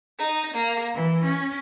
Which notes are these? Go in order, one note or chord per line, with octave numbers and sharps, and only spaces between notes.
D#4
A#3
E3
C#4